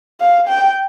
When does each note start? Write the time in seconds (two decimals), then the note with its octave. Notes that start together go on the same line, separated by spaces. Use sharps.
0.21 F5
0.48 G5